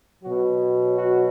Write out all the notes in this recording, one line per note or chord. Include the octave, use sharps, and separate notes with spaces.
B2 F#3 F#4
F#4